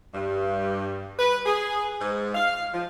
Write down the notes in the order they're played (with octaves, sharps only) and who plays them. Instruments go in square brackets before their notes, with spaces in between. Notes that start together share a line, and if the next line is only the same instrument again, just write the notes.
[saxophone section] G2
B4
G#4
G#2
F5
F3